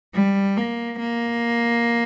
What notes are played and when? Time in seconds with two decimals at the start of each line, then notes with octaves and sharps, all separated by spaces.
0.14 G3
0.57 A#3
0.99 A#3